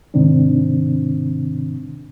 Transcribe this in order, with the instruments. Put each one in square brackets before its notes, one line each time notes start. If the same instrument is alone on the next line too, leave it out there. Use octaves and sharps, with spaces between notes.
[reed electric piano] G#2 C3 D#3 C4 D4